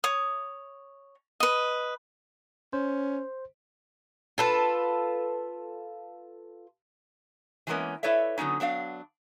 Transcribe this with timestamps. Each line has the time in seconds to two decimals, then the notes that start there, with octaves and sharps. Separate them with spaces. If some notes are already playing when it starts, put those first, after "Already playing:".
0.04 C#5 D#6
1.40 B4 D#5
2.73 C#4 C5
4.38 F4 A4 B4
7.67 E3 F#3 G#3 A#3 B3 C#4
8.03 E4 A4 B4 C#5 D5 E5
8.38 D3 F#3 B3 C#4 D#4
8.60 F#3 B3 D4 F5